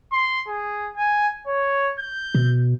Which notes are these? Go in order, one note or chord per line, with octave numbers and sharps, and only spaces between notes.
C6
G#4
G#5
C#5
G6
B2